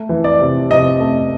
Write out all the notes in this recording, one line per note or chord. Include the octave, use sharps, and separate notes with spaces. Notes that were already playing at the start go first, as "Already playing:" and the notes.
Already playing: A3
E3
D5
C3
C3 D#5
A3